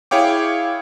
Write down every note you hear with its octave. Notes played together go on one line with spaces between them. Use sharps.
E4 G#4 C#5 F5 G5 D6